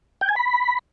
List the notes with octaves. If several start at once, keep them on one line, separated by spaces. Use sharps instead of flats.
G5
G#5
B5